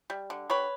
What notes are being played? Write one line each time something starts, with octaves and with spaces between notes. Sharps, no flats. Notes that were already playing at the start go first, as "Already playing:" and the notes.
G3
D3
G3 B4 C#5